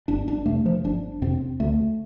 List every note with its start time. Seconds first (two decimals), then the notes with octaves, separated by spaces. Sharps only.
0.08 G1 D4
0.28 D4
0.45 F2 C3 A3
0.66 F3
0.84 G1 D4
1.22 F2 C3 C4
1.60 D2 A3